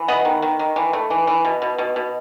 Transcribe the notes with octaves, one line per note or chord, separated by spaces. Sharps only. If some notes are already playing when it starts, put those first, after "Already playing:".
Already playing: E3
B3 D#5 F#5
D#3
D#3
D#3
E3
A3
E3
E3
B2
B2
B2
B2